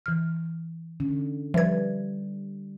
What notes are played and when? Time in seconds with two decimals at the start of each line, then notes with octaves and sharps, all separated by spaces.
0.06 E3 F6
1.00 D3 C#4
1.54 F3 G3 B4 D5 E5 G#6